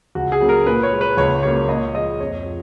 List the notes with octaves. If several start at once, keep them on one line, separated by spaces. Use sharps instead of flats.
C#2 F#4
G#4
C#3 F#3 A#3
A#4
A#2 B4
C#5
G#3
B4
C#2 C#5
C#3 F#3 A#3 C#5
A#2 D#5
F3 G#3 D#5
F2 C#5
F3